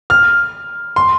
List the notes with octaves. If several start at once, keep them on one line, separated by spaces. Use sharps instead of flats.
F6
C6